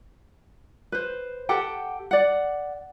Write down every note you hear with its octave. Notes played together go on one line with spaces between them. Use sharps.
B4 C5
G4 A4 F#5 G5
D5 F#5